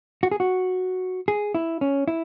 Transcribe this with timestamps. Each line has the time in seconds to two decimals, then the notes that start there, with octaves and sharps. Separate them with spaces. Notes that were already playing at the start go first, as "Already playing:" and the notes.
0.23 F#4
0.31 G#4
0.40 F#4
1.28 G#4
1.54 E4
1.81 C#4
2.08 E4